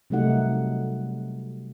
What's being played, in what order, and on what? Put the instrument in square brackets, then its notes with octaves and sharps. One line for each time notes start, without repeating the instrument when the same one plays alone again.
[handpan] C3 F#3 G3 A3 D#4 F#5